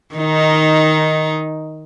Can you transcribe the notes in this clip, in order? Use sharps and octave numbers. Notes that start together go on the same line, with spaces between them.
D#3 D#4